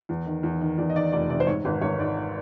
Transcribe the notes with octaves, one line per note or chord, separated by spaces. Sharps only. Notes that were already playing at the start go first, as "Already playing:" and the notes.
E2
D#3
E2
D#3
E2 D5
D#5
D#3 D5
F1 D5
C3 D5
C5
G#2 C#5
G#1 B4
G#1 C#5
G#2 D5